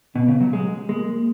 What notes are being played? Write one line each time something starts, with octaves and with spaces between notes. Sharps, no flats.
B2 B3
C#3
F#3
G#3
G#3 A#3